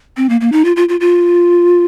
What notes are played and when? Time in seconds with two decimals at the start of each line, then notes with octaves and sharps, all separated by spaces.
0.17 C4
0.29 A#3
0.41 A#3
0.52 D#4
0.65 F4
0.76 F4
0.89 F4
1.00 F4